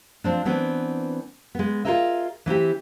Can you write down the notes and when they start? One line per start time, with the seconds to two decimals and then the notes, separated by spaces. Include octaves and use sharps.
0.24 F3 C4 D4
0.45 E3 B3 C4 D4
1.55 G#3 B3
1.85 F4 G4 G#4 A#4 D#5 E5
2.46 E3 C4 E4 G4